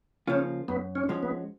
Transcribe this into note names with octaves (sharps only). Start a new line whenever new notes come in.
C#3 F3 A#3 C#4 F4
F#2 B3
C#4
F3 G#3 C#4 F#4
B3